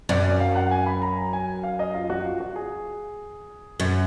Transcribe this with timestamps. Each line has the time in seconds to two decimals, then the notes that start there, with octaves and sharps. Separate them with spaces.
0.09 F#2 D5
0.24 D5
0.40 F5
0.56 F#5
0.71 G#5
0.86 B5
1.02 A#5
1.33 G#5
1.63 F5
1.79 D#5
1.94 F4
2.10 F#4
2.25 F4
2.40 F#4
2.56 G#4
3.80 F#2